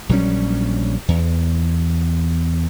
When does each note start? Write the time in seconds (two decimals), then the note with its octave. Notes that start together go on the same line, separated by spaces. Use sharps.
0.09 A#1 F#3 G3 C#4
1.08 E2